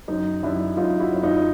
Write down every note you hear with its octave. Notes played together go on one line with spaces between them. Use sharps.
F#2 D#4
F#2 D4 E4
F#2 D#4 F4
E4 F#4
F#2
D#4 F4